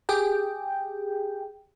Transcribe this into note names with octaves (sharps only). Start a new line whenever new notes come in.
G4 G#4 G5